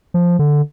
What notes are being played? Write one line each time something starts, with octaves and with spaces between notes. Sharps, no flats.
F3
D3